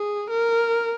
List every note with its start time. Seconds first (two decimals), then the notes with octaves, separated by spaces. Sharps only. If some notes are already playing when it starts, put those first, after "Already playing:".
Already playing: G#4
0.30 A#4